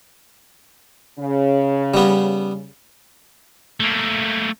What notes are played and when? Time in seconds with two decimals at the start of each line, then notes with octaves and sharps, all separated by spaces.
1.19 C#3
1.94 G3 B3
3.80 A3 A#3